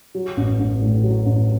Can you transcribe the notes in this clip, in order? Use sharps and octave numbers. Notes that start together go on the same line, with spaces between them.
F#3
A1
A1
A2
F#3
A1